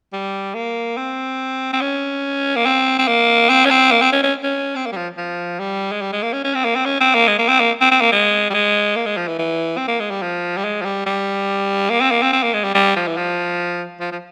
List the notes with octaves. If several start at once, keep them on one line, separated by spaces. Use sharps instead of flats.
G3
A#3
C4
C4
C#4
A#3
C4
C4
A#3
C4
C#4
C4
A#3
C4
C#4
C#4
C#4
C4
A#3
G3
F3
F3
G3
G#3
G3
G#3
A#3
C#4
C#4
C4
A#3
C4
C#4
C4
A#3
G#3
A#3
C4
A#3
C4
C4
A#3
G#3
G3
G#3
A#3
G#3
F3
E3
E3
C4
A#3
G#3
G3
F3
G3
G#3
F3
G3
G3
A#3
C4
A#3
C4
C4
A#3
G#3
G3
G3
F3
E3
F3
F3
F3